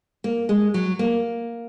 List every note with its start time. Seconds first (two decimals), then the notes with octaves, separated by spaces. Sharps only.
0.24 A#3
0.49 G#3
0.74 F#3
0.99 A#3